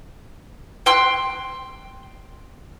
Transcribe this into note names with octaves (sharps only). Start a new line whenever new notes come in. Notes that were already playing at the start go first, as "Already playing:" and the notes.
G5 C6 F#6